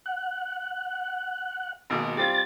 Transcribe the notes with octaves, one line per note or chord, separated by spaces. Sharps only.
F#5
G#1 B2 A#3
G3 C4 F4 A6